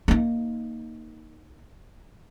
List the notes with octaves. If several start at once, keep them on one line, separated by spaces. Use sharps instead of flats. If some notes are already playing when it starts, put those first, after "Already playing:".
A#3 D#4